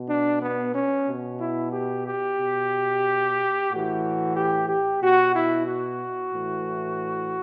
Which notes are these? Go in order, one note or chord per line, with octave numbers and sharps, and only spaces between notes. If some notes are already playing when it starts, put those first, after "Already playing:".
Already playing: B2
D4
B3
C#4
B2
E4
G4
G4
B2
A2 E3 F#4
G4
G4
B2 F#4
E4
F#4
A2 E3